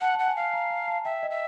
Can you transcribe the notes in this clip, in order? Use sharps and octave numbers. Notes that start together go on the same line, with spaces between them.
F#5 A5
F#5 A5
G#5
F5 A5
A#5
A#5
A5
E5 G5
D#5
E5